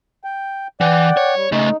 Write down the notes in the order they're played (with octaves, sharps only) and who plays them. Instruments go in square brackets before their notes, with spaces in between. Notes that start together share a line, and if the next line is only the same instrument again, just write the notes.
[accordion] G5
[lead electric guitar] E3 [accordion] D5 F#5 G5
[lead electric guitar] C#5
[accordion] G3
[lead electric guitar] C#3 A3 [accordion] D#4